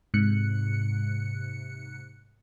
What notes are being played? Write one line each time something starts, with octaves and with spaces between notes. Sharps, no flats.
G#2 C3 F#6 C#7